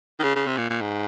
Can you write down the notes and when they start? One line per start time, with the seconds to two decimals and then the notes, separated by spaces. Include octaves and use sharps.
0.20 D#3
0.23 C#3
0.36 C#3
0.47 C3
0.57 A#2
0.70 A#2
0.81 G#2